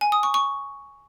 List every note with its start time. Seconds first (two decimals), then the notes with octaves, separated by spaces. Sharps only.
0.01 G#5
0.12 D#6
0.23 C#6
0.34 C#6